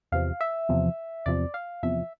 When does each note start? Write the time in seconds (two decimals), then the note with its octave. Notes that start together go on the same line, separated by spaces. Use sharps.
0.12 E2 C3 F3 F5
0.41 E5
0.69 E2 C3 F3
1.26 E2 C3 F3 D5
1.54 F5
1.83 E2 C3 F3 E5